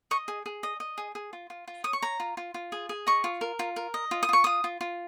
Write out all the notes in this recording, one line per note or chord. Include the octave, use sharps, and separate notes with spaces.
D#5 C#6
G#4
G#4
D#5
D#5
G#4
G#4
F4
F4
F4
C#5 D#6
C#6
C#5 A#5
F4
F4
F4
G#4
G#4
D#5 C#6
F4
A#4
F4
A#4
D#5
F4
D#6
F4 C#6
F4 D#6
F4
F4